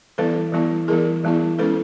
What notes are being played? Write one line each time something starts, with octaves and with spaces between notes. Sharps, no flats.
E3 G3 B3 E4 A4 B4
E3 G3 B3 E4
E3 G3 B3 E4 G#4 A#4
E3 G3 B3 E4
G#3 C#4 E4 A4 B4